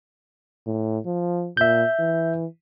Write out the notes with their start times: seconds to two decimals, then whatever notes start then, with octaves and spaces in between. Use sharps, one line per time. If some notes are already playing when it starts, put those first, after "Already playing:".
0.67 A2
1.05 F3
1.57 A#2 E5 G6
1.99 E3